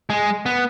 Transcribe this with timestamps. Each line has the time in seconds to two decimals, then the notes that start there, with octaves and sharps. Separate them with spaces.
0.10 G#3
0.46 B3